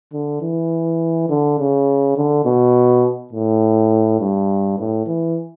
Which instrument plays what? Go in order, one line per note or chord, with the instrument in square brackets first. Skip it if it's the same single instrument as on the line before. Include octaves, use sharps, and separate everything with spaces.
[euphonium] D3
E3
D3
C#3
D3
B2
A2
G2
A2
E3